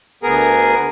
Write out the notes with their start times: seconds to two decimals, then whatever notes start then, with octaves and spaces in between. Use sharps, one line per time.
0.23 D2 B3 G#4 A#4